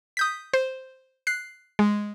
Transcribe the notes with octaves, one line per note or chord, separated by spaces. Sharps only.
D#6 G6 B6
C5
F#6 C7
G#3